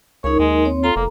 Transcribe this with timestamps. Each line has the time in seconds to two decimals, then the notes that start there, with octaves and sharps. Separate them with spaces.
0.24 C#2 D#4 A#4 C#5
0.39 D#2 G#3
0.65 C4 C#5
0.84 F4 A4 A#5
0.96 F1 A#3